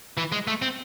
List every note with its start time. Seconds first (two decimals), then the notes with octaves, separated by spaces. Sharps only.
0.17 E3
0.32 G#3
0.48 A3
0.62 C4